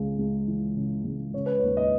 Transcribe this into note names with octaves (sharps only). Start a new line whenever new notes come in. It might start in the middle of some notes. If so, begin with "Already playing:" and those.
Already playing: C#2 C#3
C#2
E3
C#3
C#2
C#3 C#5
B4
D#2 C#5
D#5